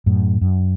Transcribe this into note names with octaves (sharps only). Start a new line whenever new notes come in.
F#2 A2
F#2